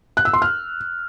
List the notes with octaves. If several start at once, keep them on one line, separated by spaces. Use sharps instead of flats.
F#6
E6
C6
F6